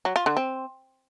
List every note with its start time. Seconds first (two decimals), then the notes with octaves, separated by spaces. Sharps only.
0.05 F#3
0.16 F4
0.26 D3
0.37 C4